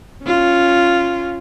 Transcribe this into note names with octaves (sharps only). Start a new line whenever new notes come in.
C#4 F4